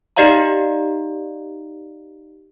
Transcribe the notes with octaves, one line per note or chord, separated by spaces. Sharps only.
D#4 G4 D5 D#5 F5 A#5